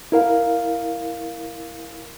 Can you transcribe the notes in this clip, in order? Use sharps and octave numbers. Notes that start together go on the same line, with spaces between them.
E4 A#4 F5